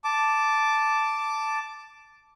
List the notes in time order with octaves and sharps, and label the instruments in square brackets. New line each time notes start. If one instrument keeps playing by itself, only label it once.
[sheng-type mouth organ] A5 D6